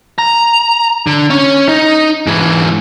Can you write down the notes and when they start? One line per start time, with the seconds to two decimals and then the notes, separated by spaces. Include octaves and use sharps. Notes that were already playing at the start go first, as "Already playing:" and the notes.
0.18 A#5
1.07 D3
1.30 C#4
1.69 D#4
2.27 G#2 E3